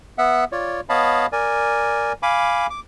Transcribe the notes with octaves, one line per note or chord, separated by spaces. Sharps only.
B3 E5 F#5
F4 C#5 D5
B3 C#5 D#5 F5 A5 B5
A#4 D5 G#5
F5 G#5 B5 D6
D6